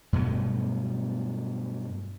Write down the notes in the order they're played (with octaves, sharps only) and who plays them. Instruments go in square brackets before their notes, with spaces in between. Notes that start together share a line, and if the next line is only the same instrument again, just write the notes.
[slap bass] G2 B2 F#3 A3